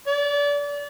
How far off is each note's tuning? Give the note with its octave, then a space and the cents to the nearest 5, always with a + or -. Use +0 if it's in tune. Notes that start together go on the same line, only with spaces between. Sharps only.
D5 -30